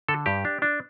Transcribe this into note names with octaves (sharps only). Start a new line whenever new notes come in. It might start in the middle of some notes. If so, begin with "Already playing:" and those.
D3 A4
G2 G4
D4
D4